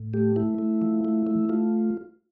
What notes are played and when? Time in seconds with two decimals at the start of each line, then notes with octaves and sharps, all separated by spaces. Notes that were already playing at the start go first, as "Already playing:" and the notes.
Already playing: A2
0.14 A3 G4
0.36 A3 E4
0.58 A3
0.82 F3
1.05 A3
1.27 A3
1.49 A3 F4